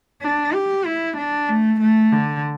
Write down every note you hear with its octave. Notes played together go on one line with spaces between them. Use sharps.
D4
G4
E4
D4
A3
A3
D3